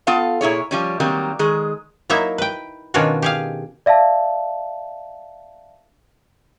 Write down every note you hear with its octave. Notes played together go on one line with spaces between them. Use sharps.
B3 F4 A4 F5 A5
A#2 E4 G#4 C#5
F3 G3 C#4
D#3 F#3 G3 A#3 C4
D#3 G#3 G#4
F#3 A#3 D#4 E4 E5
B4 G5
B2 D#3 C#4 D4 F4 F#4
G4 G#4 F5
D5 E5 F5 A5